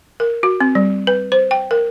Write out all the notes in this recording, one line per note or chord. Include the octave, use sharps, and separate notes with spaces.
A#4
F#4
C4
G3
B4
C5
G5
A#4